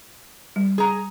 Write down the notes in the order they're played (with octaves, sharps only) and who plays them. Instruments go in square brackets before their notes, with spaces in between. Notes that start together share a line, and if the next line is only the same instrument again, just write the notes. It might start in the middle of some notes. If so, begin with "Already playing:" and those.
[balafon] G3
[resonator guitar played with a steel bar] G#4 A#5